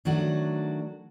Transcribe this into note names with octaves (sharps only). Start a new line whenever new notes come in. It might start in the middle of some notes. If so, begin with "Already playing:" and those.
D#3 F#3 A3 D4 F#4